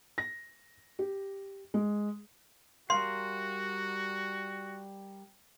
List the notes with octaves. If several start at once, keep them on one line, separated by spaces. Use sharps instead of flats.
A#6
G4
G#3
G3 F#4 A#4 F5 C6